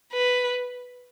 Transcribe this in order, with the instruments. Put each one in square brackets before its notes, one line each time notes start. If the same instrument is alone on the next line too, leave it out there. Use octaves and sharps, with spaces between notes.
[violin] B4